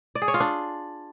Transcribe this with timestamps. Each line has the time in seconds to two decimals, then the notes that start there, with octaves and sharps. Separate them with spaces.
0.15 D5
0.22 G#4
0.28 C#5
0.34 F4
0.40 D4